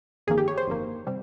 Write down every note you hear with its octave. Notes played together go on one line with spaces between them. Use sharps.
G1 F2 D#3 A#3 G#4
G4
C#5
C5
G1 F2 D#3 A#3
C3 G3 C4